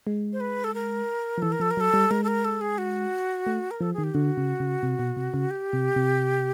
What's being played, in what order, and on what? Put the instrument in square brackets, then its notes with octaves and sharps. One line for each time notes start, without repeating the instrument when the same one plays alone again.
[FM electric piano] G#3
[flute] C5
B4
A4
A#4
[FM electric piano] F3
[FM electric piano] E3 [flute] A4
[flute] A#4
[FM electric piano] F3 [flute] A4
[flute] A#4
[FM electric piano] F#3 [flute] A4
[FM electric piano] G3
[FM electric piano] G#3 [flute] A#4
[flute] A4
A#4
A4
G#4
F#4
[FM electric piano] A3
[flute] A#4
[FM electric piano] F3 [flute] A4
[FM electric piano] D#3 [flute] G#4
[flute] G4
[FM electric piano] D3 [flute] F#4
[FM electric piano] C#3
C#3
C3
B2
C3
C#3
[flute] G4
[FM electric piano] C3
C3